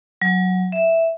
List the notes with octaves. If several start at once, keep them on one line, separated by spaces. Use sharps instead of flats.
F#3
E5